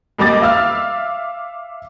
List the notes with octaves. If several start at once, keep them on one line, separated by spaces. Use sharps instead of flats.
F2 G3 A#3 D#5 D6 A6
E5 F5 E6 F6